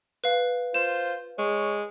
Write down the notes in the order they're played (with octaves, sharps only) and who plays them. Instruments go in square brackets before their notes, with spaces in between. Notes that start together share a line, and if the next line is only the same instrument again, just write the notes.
[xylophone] B4 F5
[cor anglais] F4 [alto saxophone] C5 [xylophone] E7
[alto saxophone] G#3 [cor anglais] C#5